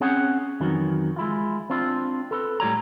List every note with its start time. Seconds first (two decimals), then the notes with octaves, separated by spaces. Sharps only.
0.01 C4 C#4 G#4 C#5 F#5
0.60 F2 D#3 E3 F#3
1.16 G#3 E4 F4
1.70 C4 D4 F4
2.31 A4 B4
2.60 A2 G3 C#5 A#5